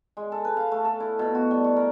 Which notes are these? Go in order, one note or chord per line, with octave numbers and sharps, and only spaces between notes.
G#3
A4
B4
F5
A3
A4
E4
B2
F#4
G3
C#6
A#4